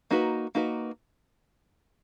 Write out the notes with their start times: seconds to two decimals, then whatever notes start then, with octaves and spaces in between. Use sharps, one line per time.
0.11 A#3 D#4 F#4 B4
0.55 A#3 D#4 F#4 B4